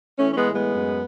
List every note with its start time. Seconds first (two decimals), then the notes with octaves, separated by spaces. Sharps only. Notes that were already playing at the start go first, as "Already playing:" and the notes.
0.19 E3 A3 C#4
0.32 C#4
0.37 G#3 B3
0.46 A2
0.55 G#3 B3
0.73 F#2